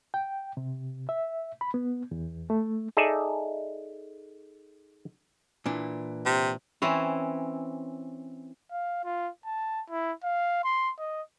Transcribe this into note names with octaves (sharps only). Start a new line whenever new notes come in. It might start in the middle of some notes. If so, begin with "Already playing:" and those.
G5
C3
E5
B5
B3
E2
A3
D#4 G#4 A4 D5 E5
A#2 E3 D4
C3
E3 C4 C#4 E4
F5
F4
A5
E4
F5
C6
D#5